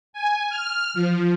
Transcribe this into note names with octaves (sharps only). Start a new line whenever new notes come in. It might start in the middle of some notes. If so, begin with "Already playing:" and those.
G#5
F6
F3